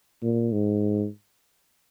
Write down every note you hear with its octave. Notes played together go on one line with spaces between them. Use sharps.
A#2
G#2